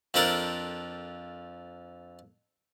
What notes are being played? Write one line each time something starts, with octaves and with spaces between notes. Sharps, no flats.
F2 F3 D4 A4 A#4